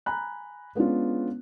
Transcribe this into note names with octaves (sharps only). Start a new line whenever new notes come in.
G#5 A#5 B5 F#6
G#3 B3 C#4 D4 F4